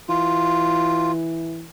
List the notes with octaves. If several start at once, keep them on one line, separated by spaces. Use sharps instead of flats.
E3 F4